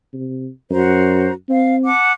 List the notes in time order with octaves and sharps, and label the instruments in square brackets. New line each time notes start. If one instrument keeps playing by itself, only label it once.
[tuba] C3
[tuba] F#2 [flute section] F#4 C5 A#5
[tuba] C4 [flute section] F5
[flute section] F#5 A5 D6